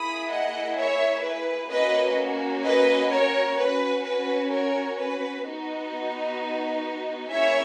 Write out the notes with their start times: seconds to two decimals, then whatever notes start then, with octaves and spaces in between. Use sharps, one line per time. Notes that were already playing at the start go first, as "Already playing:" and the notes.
Already playing: A#3 E4 G#4 B5 D#6
0.30 D#5 F#5
0.77 C#5 E5
1.23 B4
1.70 A#3 C#4 F#4 B4 D#5
2.64 B4 D#5
3.10 A#4 C#5
3.57 C#4 F#4 B4
4.04 B4
4.50 A#4 C#5
4.97 B4
5.43 B3 D#4 F#4
7.30 A#3 C#4 E4 G#4 C#5 E5